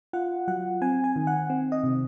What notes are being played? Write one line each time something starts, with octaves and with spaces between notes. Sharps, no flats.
F4 F#5
F#3 F#5
C4 G#5
G#5
D#3
F#5
C4
D#5
C3